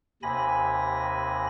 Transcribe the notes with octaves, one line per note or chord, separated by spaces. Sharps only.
D#2 C3 G#5 B5 A#6